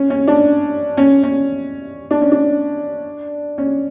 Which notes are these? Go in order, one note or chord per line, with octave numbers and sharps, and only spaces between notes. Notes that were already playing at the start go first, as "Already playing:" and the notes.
Already playing: C#4
C#4
D4
C#4
C#4
D4
C#4
D4
C#4